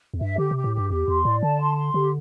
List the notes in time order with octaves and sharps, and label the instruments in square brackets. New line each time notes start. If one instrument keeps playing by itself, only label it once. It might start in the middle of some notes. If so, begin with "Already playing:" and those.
[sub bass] E2
[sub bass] G2 [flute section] E5
[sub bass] D3 [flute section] G4
[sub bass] C3 [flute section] G4
[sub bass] A2
[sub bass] G2 [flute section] G4
[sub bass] E2 [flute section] G4
[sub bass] E2 [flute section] C6
[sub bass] A2 [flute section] D5
[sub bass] D3 [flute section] A5
[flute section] C6
C6
[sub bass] D3 [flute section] G4